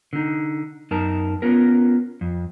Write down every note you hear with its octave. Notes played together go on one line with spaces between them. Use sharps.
D3 D#4
F#2 D#4 A#4 A5
B3 C#4 F4 A#4
F2